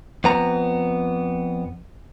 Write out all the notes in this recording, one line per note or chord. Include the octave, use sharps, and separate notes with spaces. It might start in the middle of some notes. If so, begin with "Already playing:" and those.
F2 B3 A#5